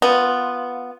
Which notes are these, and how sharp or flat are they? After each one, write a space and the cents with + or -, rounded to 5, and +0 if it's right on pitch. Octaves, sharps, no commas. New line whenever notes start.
B3 +0 F4 +0